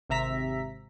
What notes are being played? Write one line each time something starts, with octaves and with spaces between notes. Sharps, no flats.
G#1 C3 E5 A#5 B6